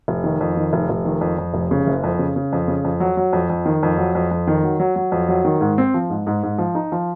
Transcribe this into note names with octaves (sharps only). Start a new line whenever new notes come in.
F1
D#3
F2
D#3
F1
F1
D#3
F2
F2
F1
C#3
F#1
F2
C#3
C#3
F2
C#3
F2
F#3
F#3
F2
F2
D#3
F2
F#3
F2
F2
D#3
F#3
F#3
F#3
F2
F#3
D#3
G#2
C4
F3
G#2
G#2
G#2
F3
D#4
F3